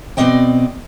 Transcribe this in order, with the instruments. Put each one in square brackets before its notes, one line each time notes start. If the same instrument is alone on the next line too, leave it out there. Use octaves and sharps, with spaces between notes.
[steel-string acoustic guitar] B2 D#3 C4 D5 D#5 G5